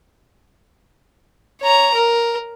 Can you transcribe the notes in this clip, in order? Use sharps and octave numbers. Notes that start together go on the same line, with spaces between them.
C#5 A#5
A#4